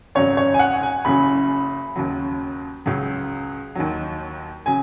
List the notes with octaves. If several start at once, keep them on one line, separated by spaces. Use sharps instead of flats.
G#1 F#2 C#3 F#3 C#5
C#5
G#5
F#5
G#5
F#1 F#2 C#3 F#3 B5
D#2 C#3 F#3
C#2 C#3 F#3
D#2 D#3 F#3
C#3 F#3 G#5